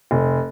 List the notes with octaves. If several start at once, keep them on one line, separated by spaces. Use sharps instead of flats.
F1